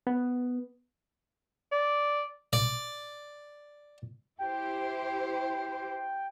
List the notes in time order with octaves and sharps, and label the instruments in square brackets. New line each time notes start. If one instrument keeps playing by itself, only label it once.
[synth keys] B3
[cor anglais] D5
[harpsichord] D5
[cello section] E4 G4 C5 [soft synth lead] G5